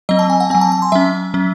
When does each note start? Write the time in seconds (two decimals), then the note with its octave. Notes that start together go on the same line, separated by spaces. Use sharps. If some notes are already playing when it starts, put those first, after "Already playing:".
0.09 F#3 C4 D#5
0.19 A5
0.30 G#5
0.40 F#5
0.50 F#3 C4 G#5
0.61 A5
0.72 A5
0.82 C6
0.92 F#3 C#4 E5
1.34 F#3 C#4